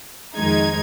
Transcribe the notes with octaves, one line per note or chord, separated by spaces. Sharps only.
F2 D#3 G#3 D#4 G#6